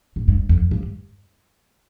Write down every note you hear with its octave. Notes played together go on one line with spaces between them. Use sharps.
A2
G2
F2
G2